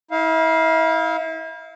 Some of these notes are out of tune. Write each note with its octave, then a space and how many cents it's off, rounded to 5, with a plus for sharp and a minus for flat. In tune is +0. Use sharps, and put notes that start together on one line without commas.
E4 -35 F5 +0